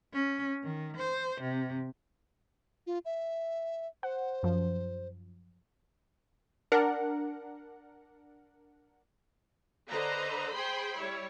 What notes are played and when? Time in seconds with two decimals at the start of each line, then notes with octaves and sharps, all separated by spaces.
0.13 C#4
0.63 D#3
0.97 C5
1.41 C3
2.87 F4
3.05 E5
4.03 C5 F#5
4.43 F#2 F3
6.72 D4 A#4 F#5
9.89 D3 B4 C5 D#5 A#5
10.52 G#4 C5 G5 B5 C6
10.96 G3 E4 C#5